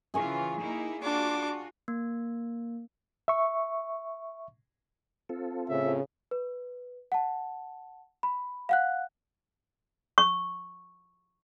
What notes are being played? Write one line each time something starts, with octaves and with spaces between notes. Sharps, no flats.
C#3 E3 F4 G#4 G#5 C#6
A#3 D#4 E4
D4 F4 F#4 D6
A#3
E5 C#6
C4 F4 A4
A2 C#3 E5
B4
F#5 A5
B5
F5 F#5 F#6
C#6